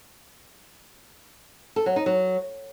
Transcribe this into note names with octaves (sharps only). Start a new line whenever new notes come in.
A4
F#3
D#4
F#3